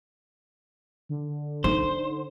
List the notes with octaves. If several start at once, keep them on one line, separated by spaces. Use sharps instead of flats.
D3
D#4 C5